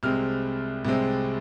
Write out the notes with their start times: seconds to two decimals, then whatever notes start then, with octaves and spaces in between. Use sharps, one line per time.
0.03 C2 C3 G#3 C4 F6
0.85 C2 C3 G#3 C4